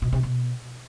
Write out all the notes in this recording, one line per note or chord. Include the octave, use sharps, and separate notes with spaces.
B2
C3
B2